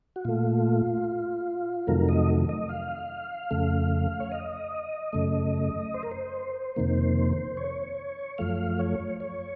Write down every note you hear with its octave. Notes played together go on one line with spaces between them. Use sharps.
F#4
A#2 A3 F4
F2 C3 D#3 F#3 A3 A#4
D#5
D#5
F5
F2 C#3 A3
C#5
D#5
F#2 C#3 A3
C5
A#4
C5
F2 C3 D#3 A#3
C#5
F#2 F3 A3 F5
C#5
C#5